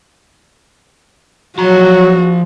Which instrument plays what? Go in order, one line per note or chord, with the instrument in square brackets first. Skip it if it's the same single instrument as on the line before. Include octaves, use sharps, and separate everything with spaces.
[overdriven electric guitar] F3 A#5 [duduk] F#3 [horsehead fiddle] F#4